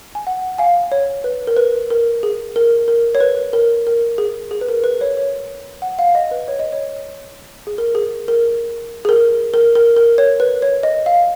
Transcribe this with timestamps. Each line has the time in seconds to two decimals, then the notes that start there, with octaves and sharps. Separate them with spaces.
0.15 G#5
0.27 F#5
0.58 F5 G#5
0.92 C#5
1.24 B4
1.47 A#4
1.57 B4
1.90 A#4
2.23 G#4
2.56 A#4
2.88 A#4
3.15 C#5
3.20 B4
3.53 A#4
3.87 A#4
4.18 G#4
4.51 G#4
4.61 B4
4.68 A#4
4.84 B4
5.01 C#5
5.17 C#5
5.82 F#5
5.99 F5
6.15 D#5
6.31 B4
6.48 C#5
6.59 D#5
6.72 C#5
7.67 G#4
7.78 A#4
7.95 G#4
8.28 A#4
9.05 G#4
9.09 A#4
9.54 A#4
9.75 A#4
9.97 A#4
10.18 C#5
10.40 B4
10.62 C#5
10.83 D#5
11.06 F5